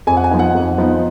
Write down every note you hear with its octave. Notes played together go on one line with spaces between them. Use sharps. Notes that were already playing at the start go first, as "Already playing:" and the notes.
F2 G#5
F#5
G#5
F3 B3 D#4
F#5
F2
F3 B3 D#4